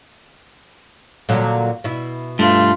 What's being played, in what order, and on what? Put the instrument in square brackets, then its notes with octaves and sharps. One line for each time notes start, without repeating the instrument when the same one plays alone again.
[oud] A#2 D3 F#3
B2 E4
[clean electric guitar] G2 A3 [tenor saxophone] F4